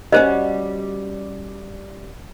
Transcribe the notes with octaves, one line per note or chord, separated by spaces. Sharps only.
G3 C#4 F#4 C5 D#5